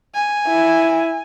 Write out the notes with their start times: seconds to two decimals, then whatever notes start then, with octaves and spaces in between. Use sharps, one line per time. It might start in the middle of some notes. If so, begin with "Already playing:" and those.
0.15 G#5
0.48 E4